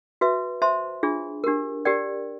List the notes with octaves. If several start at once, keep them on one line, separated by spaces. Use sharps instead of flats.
F#4 B4 E5
C5 E5 A5 C6
D4 F4 G#4
D4 G4 A#4
G4 A#4 D5 G5